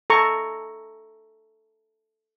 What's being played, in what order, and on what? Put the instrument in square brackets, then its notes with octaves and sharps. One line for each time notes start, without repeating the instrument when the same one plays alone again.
[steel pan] A4 A#5 C#6